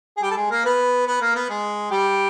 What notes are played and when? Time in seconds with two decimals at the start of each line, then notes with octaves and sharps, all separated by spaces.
0.17 G#4
0.23 G3 G4
0.31 A4
0.37 G#3 G#4
0.51 A#3 A#4
0.65 B3 B4
1.07 B3 B4
1.21 A#3 A#4
1.35 B3 B4
1.49 G#3 G#4
1.91 G3 G4